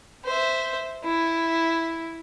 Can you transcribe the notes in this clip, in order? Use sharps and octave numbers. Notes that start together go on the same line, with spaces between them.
C5 E5
E4